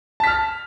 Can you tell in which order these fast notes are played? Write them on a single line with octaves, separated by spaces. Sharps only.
A5 B6 F6